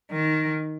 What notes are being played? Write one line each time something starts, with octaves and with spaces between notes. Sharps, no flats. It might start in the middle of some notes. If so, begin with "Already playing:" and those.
D#3